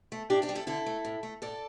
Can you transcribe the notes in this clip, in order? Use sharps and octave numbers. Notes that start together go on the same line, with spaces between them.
A3
A2 D4 G4
D4 G4
G3
E4 A4
D3 E4 A4
A3
A2
A3
A2 A4 D5